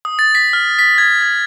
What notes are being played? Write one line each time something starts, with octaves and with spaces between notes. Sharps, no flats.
D#6
A6
B6
F6
B6
G#6
G#6